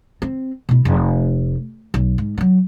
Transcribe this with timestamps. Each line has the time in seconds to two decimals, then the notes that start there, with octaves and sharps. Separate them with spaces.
0.22 C4
0.69 B2 E4
0.85 F1
1.94 B1
2.18 G#2
2.38 D3 F#3